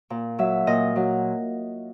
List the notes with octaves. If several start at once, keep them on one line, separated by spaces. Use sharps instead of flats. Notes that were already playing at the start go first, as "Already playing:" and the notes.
A#2
F#3 E5
A#2 D#5
F#3